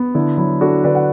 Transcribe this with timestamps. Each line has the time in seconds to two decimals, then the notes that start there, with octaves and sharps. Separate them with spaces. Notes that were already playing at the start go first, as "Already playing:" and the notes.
Already playing: B3
0.14 D3 E4
0.37 F#3 E4
0.61 D4 F#4 A4
0.84 D3 B4 D5
0.95 F#5